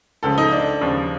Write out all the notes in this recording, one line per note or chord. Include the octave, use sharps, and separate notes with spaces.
C#2 C#3 F3 A4
D#4
D4
D#2 C#3 F3